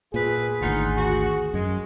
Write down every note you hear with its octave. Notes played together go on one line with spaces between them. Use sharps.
E2 A#2 F3 G#4 B4
G#1 D2 D#4 F4 F#5
F#4
F#2 G#3